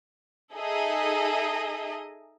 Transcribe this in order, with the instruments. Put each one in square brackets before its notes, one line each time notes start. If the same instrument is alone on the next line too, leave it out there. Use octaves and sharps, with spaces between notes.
[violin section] D#4 G#4 A4 D#5 E5